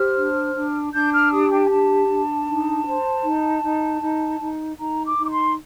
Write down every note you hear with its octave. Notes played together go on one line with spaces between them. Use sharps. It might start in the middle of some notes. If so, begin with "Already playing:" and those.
Already playing: G4 C5 F6
D4
D4
D4 G6
F6
G4 D#6
G5
D4 A5
D4
D#4
C5
D#4
D#4
D#4
D#4
D#4 A#5
D6
D#4
D6
C6